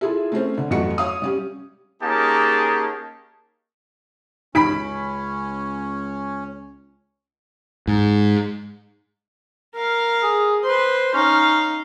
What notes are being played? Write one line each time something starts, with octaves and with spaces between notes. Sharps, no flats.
E4 F4 G#4 A4 E5
A3 C4 C#4 C5
D3
A1 F2 F#3 A3 F#4 C#7
C#5 F5 D#6
G3 C#4 G4
A#3 C#4 D#4 G4 G#4 A5
C#2 C#4 D#4 B5 B6 D7
G#2
A#4 F5
G#4
B4 C5 C6
C#4 D#4 F5